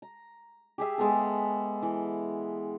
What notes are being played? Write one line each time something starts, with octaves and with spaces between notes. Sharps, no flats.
A#5
G4 G#4 E5
G#3 B3 A4
E3